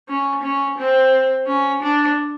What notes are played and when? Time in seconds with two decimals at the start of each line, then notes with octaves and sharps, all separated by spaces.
0.09 C#4
0.43 C#4
0.78 C4
1.47 C#4
1.82 D4